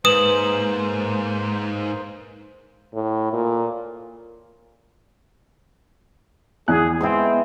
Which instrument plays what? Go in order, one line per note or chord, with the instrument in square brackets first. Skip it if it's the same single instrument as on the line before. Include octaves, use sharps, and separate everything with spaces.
[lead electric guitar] G#2 [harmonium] A#3 C5 [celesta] B4 E7 F#7 [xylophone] D#6
[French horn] A2
A#2
[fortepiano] E2 E4 F#6 [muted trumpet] G#4
[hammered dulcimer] G#3 B3 E4 [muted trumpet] C4 [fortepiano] G5 C6